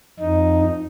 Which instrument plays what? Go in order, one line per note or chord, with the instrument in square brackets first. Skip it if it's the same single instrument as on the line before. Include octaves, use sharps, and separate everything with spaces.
[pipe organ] F2 D#4